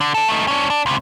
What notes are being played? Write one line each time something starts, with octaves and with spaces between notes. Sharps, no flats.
D3
D4 A4
A3 D#4
C#4 D4
D4
C#2 C3